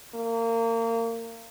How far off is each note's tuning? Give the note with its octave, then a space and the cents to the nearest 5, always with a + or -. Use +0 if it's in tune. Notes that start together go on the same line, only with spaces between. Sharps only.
A#3 -30